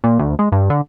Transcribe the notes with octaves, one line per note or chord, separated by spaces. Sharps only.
A#2
D2
G#3
G2
D3